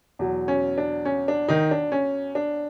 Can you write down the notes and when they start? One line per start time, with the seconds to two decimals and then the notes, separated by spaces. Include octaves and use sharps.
0.19 E2 B2 F#3
0.48 C#4
0.78 D4
1.05 C#4
1.28 D4
1.48 D#3 D#4
1.71 D4
1.92 C#4
2.35 D4